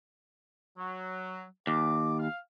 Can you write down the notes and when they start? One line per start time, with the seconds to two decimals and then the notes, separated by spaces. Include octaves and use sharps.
0.78 F#3
1.67 D#2 D6
2.19 F5